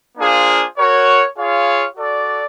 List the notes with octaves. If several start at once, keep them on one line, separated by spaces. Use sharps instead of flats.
A#3 D4 F4 G#4 C5
F#4 A#4 C#5
F4 G#4 C#5 F5
F#4 A4 D5